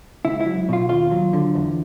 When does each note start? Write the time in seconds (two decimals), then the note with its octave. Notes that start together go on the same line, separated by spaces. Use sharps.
0.25 C#2 E4
0.41 E4
0.46 F#3
0.69 B2 F4
0.89 D#2 F4
1.11 F#3
1.33 D3
1.55 E2